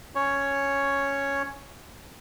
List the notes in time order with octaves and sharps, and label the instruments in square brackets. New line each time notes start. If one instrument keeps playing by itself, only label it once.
[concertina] C#4 C#5